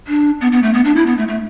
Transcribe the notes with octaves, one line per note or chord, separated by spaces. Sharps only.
D4
B3
B3
A3
B3
D4
E4
B3
A3
A3